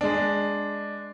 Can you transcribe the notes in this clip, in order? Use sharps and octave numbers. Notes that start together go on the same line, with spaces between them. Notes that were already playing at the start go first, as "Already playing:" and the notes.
G#3 D4